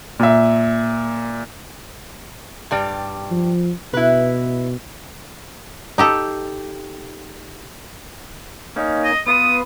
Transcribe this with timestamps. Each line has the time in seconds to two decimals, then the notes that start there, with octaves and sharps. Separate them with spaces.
0.20 A#2 E5
2.71 G2 G3 D5
3.31 F3
3.94 B2 E4 B4
5.98 D#4 G4 A4
8.76 A#3 C#4 D#4
9.04 D#5
9.27 B3 F4 B4 D#6